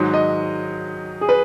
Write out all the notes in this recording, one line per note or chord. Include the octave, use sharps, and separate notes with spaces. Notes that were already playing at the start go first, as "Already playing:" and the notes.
Already playing: G#2 D#3 F#3
D#5
G#4
B4